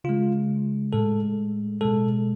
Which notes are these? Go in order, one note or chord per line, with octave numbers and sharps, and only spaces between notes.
C#3 G#3 F4
A2 G#3 A4
B2 G#3 A4